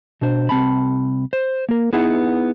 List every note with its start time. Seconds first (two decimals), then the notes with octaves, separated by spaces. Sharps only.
0.21 B2 D4 C5
0.49 C2 C4 A5 B5
1.33 C5
1.69 A#3 A#4
1.93 B3 D#4 E4 G#4 B4 F#5